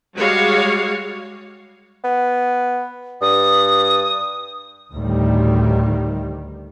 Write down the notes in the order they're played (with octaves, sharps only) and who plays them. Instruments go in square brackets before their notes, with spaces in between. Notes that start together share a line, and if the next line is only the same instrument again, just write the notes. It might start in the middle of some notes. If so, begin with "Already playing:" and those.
[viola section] G3 G#3 F#4 C#5 F5
[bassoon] B3
[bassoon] G2 [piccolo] D#6
[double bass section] D2 A2 D#3 G3